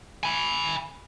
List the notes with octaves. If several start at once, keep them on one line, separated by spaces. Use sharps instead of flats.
G#5 B5